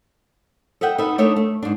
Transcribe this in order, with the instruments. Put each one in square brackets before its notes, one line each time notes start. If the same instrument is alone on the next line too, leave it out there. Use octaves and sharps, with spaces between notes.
[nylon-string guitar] A4 D#5 E5 F#5 G5
D#4 A4 B4 E5
A3 D4 D#4 A4 C#5 E5
A3
G#2 D4